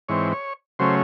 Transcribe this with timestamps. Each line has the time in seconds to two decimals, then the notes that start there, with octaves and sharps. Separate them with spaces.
0.09 G#2 E3 C4 C#5
0.32 C#5
0.79 C#3 F#3 A3 C#4 C5